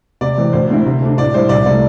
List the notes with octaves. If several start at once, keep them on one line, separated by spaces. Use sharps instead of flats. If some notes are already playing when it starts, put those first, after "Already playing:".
C3 D5
E3 C4
D2 C5
D3 C4 E4
C3
A3 D4
A2 D5
G3 E4 C5
C2 D5
C3 A3 D5